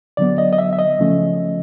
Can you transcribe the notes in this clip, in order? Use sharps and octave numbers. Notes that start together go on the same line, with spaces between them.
D3 F#3 B3 D5
D#5
D#5
E5
E5
D#5
C#3 F3 A3 C#4